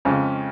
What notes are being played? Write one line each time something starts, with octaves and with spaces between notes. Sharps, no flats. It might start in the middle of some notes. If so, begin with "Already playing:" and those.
F2 C#3 G#3 C#4